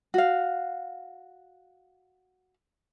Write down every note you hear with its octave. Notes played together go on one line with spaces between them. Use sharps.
F#4 F5